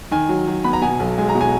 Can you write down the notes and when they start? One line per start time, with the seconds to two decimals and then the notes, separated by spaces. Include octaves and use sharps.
0.11 D#3 G#5
0.29 F#3
0.47 F#3
0.64 B3 B5
0.73 A#5
0.82 B2 G#5
1.00 B1
1.18 G#3 G#5
1.29 A#5
1.35 B2
1.41 G#5